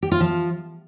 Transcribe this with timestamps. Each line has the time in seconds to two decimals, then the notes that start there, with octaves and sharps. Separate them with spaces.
0.03 G4
0.12 F4
0.21 F3